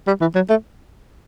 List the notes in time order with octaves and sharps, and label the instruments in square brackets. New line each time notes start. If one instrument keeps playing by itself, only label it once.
[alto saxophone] G3
E3
F#3
A3